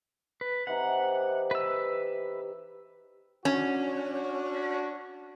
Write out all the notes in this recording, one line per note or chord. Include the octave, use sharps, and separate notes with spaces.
B4
C3 E3 D#4 F#5
B4 E6
C#4 D4 F#4